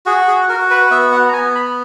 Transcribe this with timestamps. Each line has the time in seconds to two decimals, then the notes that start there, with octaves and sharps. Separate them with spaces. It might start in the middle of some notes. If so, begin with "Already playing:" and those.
0.06 F#4 G#4
0.28 G#4
0.49 F#4 A#4
0.70 B4
0.91 B3 E5
1.12 F#5
1.29 A#5
1.33 B3 G#5
1.55 B5